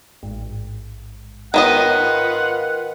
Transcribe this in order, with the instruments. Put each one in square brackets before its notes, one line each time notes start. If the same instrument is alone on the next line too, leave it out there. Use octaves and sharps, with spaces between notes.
[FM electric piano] A1 G#2
[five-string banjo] D#3 B3 D#5 [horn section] F4 B4 F#5